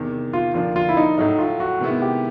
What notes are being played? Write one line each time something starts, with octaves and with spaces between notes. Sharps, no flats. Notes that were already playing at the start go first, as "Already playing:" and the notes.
Already playing: E2 C3 D#3
F4
D#2 D3 F3 A#3 D4 F4
F4
E4
D#4
A2 F#3 A3 D#4
F4
F#4
C3 D#3 G#3 B3 E4
G4